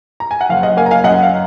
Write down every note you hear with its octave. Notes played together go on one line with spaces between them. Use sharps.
A#5
G#5
F#5
F#1 F5
D#5 F#5
A#3 F5 G#5
A#5
F5 G#5
F#2 D#5 F#5
F5